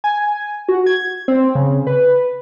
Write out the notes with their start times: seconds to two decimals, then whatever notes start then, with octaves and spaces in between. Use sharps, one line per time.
0.04 G#5
0.69 F#4
0.86 G#6
1.28 C4
1.55 C#3
1.87 B4